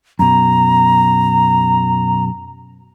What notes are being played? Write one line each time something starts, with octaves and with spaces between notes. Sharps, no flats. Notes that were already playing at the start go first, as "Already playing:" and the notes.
F#2 B2 A#5